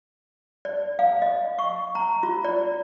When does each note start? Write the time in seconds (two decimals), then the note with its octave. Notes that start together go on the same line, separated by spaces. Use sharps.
0.65 D5
0.99 F5
1.22 D#5
1.59 C#6
1.95 A#5
2.23 F4
2.44 D5